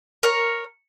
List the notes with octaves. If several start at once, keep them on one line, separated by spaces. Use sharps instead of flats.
A#4 C#5